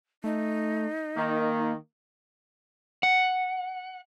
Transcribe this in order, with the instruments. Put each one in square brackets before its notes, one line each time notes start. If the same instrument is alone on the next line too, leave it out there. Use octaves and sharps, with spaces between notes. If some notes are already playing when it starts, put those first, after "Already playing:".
[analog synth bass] A3 [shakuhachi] D#4
[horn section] D#3 [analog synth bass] A#3
[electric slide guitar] F#5